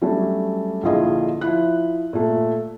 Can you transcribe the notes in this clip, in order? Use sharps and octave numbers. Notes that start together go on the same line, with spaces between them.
F#3 G3 A3 C#4 D4
A#1 D3 E4 F4 G#4 D#5
F3 E4 F#6
A#2 A3